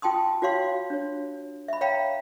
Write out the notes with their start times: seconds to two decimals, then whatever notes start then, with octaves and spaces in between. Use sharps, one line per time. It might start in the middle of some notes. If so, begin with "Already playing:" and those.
0.02 F4 G5 A5 C6 D#6
0.42 F4 F#4 C#5 F5 C6
0.90 D4 C#5
1.68 E5 B5
1.81 C#5 E5 F5 G5 A#5 B5